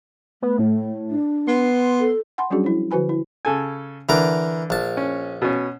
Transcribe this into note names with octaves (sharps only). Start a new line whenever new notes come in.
A3 B3
A2
D4
B3 C6
A4
F#5 G#5 B5 C6
F#3 G3 C#4 D4 F#4 G#4
F3 E4
D3 F3 F#4 B4 G#5 B5
E4
C#3 A4 G#5
D3 E3 A#4 D6
A#1 A5
C#4
B2 C#4